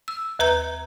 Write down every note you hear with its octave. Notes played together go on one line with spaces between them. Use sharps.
E6
D#2 B4 A#5 G6